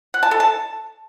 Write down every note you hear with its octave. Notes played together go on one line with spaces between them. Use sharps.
F#5
A5
A4
A5